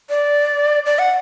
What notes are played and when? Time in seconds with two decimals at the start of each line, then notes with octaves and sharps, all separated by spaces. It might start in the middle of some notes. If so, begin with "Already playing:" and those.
0.10 D5
0.86 D5
0.99 F#5